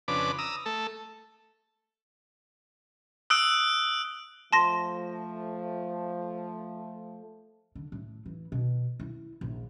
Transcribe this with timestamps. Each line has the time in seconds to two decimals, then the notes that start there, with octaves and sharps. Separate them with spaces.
0.08 F2 C#3 D4 B4 D6
0.38 A#5 D#6 E6
0.66 A3 A4
3.30 D#6 E6 F#6 D7
4.53 F3 A3 A5 C6 A#6
7.75 D3
7.92 A2
8.26 E3
8.52 B2
9.00 E4
9.41 A#1